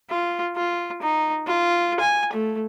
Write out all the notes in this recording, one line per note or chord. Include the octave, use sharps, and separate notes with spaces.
F4
F4
D#4
F4
G#5
A3